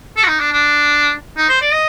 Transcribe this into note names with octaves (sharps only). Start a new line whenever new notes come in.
A4
F#4
D#4
D4
D4
D#4
C5
D5
D#5